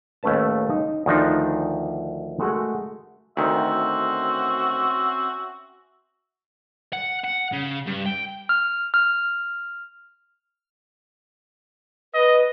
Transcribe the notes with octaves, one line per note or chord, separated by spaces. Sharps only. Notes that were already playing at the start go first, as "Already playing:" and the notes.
D#2 A2 A3 C#4 B4 A5
D#4
D2 D#3 F3 D4 D#4 F4
G#3 A3 F#4 G#4 A#4 F#5
D2 D#3 C4 C#4 F#4 C5 E5
F#5
F#5
C#3
G2
G5
F6
F6
B4 D#5